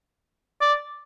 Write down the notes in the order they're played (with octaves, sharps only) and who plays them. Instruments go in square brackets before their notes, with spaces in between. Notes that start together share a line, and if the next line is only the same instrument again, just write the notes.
[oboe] D5